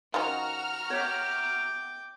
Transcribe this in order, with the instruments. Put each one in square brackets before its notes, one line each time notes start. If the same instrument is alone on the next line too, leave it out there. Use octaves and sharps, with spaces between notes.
[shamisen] D#3 F3 C#4 [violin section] F#4 A#5 F6
[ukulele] C#5 E5 [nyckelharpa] G5 D6